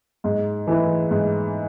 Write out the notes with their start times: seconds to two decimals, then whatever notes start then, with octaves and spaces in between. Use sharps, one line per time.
0.24 G#2
0.67 E3 A3 E4 B4
1.11 G#2